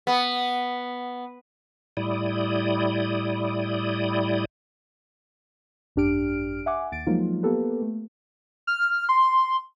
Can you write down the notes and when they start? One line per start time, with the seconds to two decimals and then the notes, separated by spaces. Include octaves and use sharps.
0.07 B3
1.97 A2 G3 E4 D5 D#6
5.96 G#1 F#2 D4 G4 F6 D7
6.66 E5 F#5 G#5 D6
6.92 D#2 A6 D7
7.07 F3 F#3 G#3 A#3 D#4 F4
7.43 A#3 B3 G4 A4 B4
7.82 A3
8.67 F6
9.09 C6